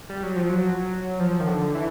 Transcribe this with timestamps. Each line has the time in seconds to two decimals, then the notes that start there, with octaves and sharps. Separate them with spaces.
0.09 G3
0.23 F#3
0.36 F3
0.49 F#3
1.20 F3
1.40 D#3
1.47 D3
1.75 E3